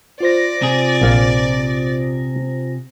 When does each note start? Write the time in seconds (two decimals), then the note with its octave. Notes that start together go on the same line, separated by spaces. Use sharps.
0.20 F4 C5 D5 A#6
0.62 C3 G#4
1.02 A#1 F5